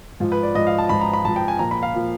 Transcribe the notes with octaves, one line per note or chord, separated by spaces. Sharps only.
G#2 F3 F4
B4
D5
G#2 F3 D#5
F5
A5
G#2 F3 B5
A#5
B5
G#2 F3 A5
G5
G#5
A#2 F3 A#5
B5
F5
A#2 F3